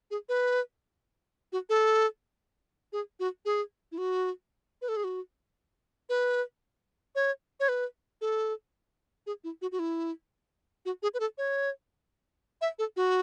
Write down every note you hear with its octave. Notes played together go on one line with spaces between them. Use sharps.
G#4
B4
F#4
A4
G#4
F#4
G#4
E4
F#4
B4
A4
G#4
F#4
B4
C#5
C#5
B4
A4
G#4
E4
F#4
F#4
E4
F#4
G#4
B4
A4
C#5
E5
A4
F#4